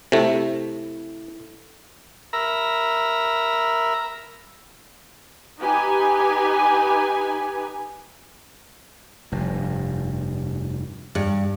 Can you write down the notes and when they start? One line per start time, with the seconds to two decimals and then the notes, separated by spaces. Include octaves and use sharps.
0.12 C3 A3 E4 A4
2.33 A#4 E5 A#5 B5
5.62 D#4 G4 B4 G#5
9.32 F1 G2
11.15 G2